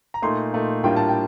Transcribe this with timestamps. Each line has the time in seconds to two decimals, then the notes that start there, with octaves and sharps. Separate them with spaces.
0.14 A#5
0.22 A#2 A3 D#4 C6
0.53 A#2 A3 D#4
0.84 A2 G3 A#3 D4 F4 G5
0.96 A5
1.09 G5